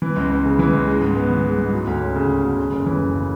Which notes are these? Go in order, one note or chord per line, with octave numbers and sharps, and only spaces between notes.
E3
C#2
C#2
C#3
E3
C#2
G#3
G#2
B3
E3
G#3
G#2
F#3
D2
C#4
C#3
F#3
D2
C#3
F#1
E3
F#2
C#3